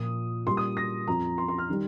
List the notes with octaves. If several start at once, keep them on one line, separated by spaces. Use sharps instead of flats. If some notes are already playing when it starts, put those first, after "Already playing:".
Already playing: A#2 F3 D#6
A#2 G3 C6
D#6
A#6
F2 F3 A#5
C6
C6
F6
D#3 G3